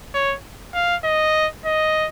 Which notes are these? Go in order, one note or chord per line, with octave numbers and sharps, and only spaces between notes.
C#5
F5
D#5
D#5